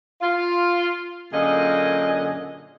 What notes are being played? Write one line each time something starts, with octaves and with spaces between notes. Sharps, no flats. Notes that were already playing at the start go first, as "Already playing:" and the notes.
F4
F#2 A#2 D3 G#4 D#5